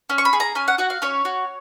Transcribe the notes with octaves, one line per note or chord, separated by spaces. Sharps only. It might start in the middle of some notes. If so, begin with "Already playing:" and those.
C#4
C#6
B5
G#4
A#5
C#4 G#5
F#5
F#4 F#5
F5
C#4 C#5
F#4